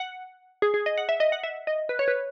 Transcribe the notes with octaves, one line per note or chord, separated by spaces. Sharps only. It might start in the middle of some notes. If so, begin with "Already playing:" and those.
Already playing: F#5
G#4
G#4
D#5
F#5
E5
D#5
F#5
E5
D#5
B4
C#5
B4